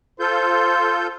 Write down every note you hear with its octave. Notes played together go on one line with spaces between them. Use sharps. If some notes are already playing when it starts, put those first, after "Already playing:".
F4 A4 C5 G6